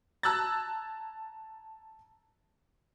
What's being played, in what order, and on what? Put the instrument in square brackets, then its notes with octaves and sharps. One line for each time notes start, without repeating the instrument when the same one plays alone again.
[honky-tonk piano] A5 A#5 E6 F#6 G#6 A6